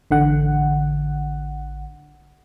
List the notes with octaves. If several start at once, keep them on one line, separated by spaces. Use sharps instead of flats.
A1 D3 F#5